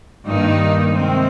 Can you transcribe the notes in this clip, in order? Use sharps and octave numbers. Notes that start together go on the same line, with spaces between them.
G2 D#3 G3 A#3 D#4
C3 D#3 G#3 C4